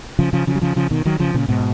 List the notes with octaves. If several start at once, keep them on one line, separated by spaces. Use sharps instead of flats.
C#3 F3
C#3 F3
C#3 F3
F#3
C#3 F3
C#3 F3
B2 D#3
D#3 F#3
C#3 F3
A#2 C#3
G#2 B2